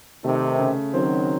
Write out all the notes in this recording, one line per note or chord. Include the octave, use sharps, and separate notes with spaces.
C3 D#3 A3
C#3
D#3 F#3 C4